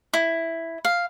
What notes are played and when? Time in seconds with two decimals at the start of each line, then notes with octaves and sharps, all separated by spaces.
0.13 E4
0.85 F5